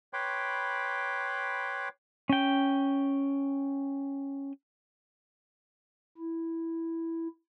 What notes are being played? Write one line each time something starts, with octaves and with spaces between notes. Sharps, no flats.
B4 C#5 G5 B5 C6 D6
C#4 G5
E4